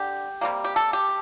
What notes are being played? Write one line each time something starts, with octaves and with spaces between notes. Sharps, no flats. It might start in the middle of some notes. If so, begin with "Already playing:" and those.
Already playing: D3 G4
C3 G3 A#3
G4
A4
G4